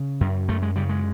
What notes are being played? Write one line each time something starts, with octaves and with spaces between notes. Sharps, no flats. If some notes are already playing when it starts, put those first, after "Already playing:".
Already playing: C#3
F#2
F#2 A3
G#3
C#3 G3
G#3